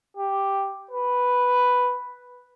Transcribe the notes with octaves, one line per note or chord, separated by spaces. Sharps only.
G4
B4